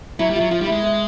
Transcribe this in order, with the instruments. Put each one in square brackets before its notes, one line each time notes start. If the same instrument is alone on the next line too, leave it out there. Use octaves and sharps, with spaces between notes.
[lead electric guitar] F#3 [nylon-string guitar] E4
[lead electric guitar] G3
[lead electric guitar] F#3 [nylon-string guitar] F4
[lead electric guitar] F3 [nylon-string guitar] F4
[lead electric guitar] G3 [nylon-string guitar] D#4
[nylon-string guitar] E4
[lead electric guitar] G#3
[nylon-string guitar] B3